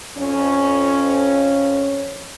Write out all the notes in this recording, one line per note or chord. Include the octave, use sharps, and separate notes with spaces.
F2 C#4